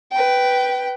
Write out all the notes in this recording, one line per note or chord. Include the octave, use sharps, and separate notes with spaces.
B4 G5